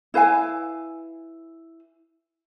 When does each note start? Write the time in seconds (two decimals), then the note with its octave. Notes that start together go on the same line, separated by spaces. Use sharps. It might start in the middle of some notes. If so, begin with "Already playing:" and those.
0.14 E4 B4 F5 G#5